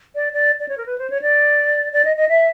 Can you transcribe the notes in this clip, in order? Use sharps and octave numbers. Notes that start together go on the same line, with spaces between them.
D5
D5
D5
C#5
A#4
B4
C5
C#5
D5
D5
D#5
D#5
E5